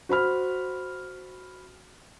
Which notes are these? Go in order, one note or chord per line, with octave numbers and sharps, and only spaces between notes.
F#4 C5 B5 F6